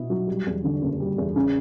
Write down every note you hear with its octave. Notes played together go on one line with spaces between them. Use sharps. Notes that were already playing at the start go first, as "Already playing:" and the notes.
Already playing: B2 B3 E4
F#3
G3
E2
D3
F#1
G3
E2
C#3